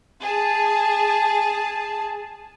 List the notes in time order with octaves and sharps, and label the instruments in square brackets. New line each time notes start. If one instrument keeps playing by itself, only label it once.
[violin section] G#4 A5